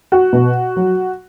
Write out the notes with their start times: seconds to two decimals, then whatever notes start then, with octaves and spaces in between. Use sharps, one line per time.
0.12 F#4
0.33 B2
0.76 F#3